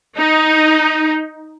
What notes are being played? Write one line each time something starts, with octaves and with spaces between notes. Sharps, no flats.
D#4